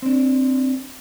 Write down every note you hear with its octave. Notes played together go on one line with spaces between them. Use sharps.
C4 D4